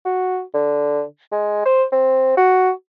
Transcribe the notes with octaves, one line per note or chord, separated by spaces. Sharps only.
F#4
D3
G#3
C5
C4
F#4